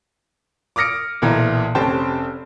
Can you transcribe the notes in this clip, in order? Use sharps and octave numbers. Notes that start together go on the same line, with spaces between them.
D6 D#6 F6 A#6 C#7 D7
B1 A#2 E3 A#5
F1 C#4 G4 C5 G5 A5